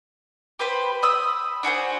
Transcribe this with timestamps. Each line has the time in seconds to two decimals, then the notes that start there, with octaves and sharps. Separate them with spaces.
0.59 G4 B4 C5 B5
1.02 B5 D#6 E6
1.63 D4 F#4 G#4 C5